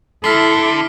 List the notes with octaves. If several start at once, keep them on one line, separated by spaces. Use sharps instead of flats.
D3 E4 A4 F6 B6 C7